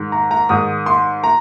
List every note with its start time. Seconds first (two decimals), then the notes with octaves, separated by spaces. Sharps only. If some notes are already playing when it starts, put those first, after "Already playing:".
Already playing: G#2 D#3
0.12 A#5
0.31 A#5
0.49 G#2 D#3 D#6
0.86 C6
1.24 A#5